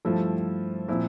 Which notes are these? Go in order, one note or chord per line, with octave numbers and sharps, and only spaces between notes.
G2 F3 A3 E4 A4
A#2 F3 C4 E4